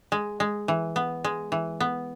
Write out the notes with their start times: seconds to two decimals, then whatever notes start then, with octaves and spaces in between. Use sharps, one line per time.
0.12 G#3
0.40 G#3
0.68 E3
0.96 B3
1.24 G#3
1.52 E3
1.80 B3